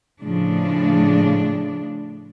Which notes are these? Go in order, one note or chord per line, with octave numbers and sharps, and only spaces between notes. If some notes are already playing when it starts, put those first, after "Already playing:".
A2 C#3 F3 D4